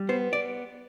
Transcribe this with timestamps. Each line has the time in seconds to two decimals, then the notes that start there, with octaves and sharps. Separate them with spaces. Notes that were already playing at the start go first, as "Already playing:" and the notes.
Already playing: G3
0.09 B3 C5
0.33 D5